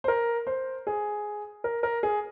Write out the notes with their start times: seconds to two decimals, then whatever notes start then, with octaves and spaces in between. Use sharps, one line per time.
0.04 C5
0.08 A#4
0.47 C5
0.87 G#4
1.64 A#4
1.83 A#4
2.03 G#4